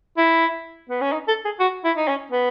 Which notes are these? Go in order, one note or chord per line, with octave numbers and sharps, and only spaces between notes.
E4
B3
C#4
D#4
A4
G#4
F#4
E4
D#4
C#4
B3